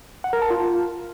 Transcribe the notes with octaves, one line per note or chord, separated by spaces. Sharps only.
F#5
A#4
A5
F4